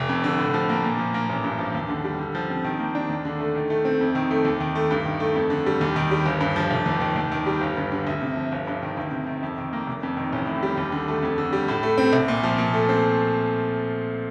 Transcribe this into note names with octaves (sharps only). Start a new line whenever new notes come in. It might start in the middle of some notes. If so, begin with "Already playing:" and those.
Already playing: F1
F2
D3
A2
F3
A#3
A#2
F3
A#3
A1
G2
F3
D#2
D3
G3
D3
F3
C4
D#3
A#3
D4
D#2
D3
A3
D#3
A3
C4
F2
D#3
A3
D#2
D#3
A3
G2
D#3
A3
F2
D3
G3
D#2
D#3
G3
G1
G2
F3
F1
D#2
D#3
D#2
D#3
G3
G1
G2
D3
D2
C3
F3
G1
G2
D#3
D2
C3
D#3
F2
D#3
A#3
F1
F2
D#3
A1
A2
G3
D#2
D3
A3
F2
D3
G3
A2
A3
C4
C2
A#2
F3
A#2
A3
C4